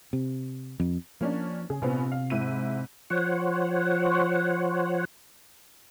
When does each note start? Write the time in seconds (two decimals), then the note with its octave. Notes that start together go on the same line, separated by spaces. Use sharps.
0.13 C3
0.80 F2
1.21 F3 A#3 C#4 D4
1.70 C#3 G#4
1.82 A#1 C3 B3 C4
2.12 F5
2.30 G#2 E4 D#7
3.10 F3 C5 C#5 F#5